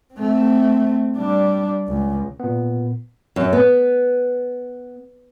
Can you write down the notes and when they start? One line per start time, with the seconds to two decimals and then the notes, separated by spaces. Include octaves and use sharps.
0.14 A3 C4
1.17 G3 D4
1.88 C#2
2.40 A#2 B3
3.36 F#2
3.53 B3